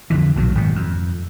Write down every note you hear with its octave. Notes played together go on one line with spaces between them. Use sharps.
F2 D3 E3
B1 A#2 F#3
G#1 G#2 B2
F2